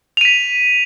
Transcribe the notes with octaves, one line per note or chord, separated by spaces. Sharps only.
B6 D#7 F7